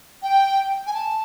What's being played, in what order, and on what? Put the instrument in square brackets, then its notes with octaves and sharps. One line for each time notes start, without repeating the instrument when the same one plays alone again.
[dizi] G5
G#5
A5